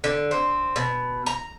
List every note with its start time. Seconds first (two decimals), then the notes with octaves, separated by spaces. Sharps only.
0.04 D3
0.31 C4
0.76 B2
1.26 A#5